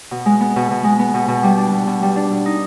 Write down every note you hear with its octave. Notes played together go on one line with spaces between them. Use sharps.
B2
G#3
B3
B2
B2
G#3
B3
B2
B2
G3
D4
B2
B2
G3
D4
B2
D#4